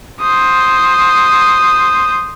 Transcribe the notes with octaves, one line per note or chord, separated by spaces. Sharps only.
C5 D#6